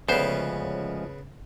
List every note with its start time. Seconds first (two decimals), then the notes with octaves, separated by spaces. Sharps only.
0.09 D2 C#3 F3 G#3 B3 C#4 C5